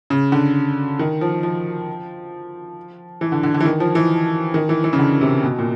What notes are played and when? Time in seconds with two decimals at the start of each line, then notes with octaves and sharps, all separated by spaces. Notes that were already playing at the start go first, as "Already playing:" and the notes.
0.10 C#3
0.32 D3
0.99 D#3
1.21 F3
1.43 F3
3.21 E3
3.32 D3
3.43 D3
3.54 D3
3.60 E3
3.65 D#3
3.80 F3
3.95 E3
4.54 D#3
4.69 E3
4.84 E3
4.93 C#3
4.99 D3
5.21 C3
5.43 B2
5.59 A#2